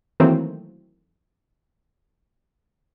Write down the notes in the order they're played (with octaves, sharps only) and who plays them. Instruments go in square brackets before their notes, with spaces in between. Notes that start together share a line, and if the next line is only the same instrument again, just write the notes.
[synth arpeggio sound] D#3 E3 F#3 A3 A#3 C4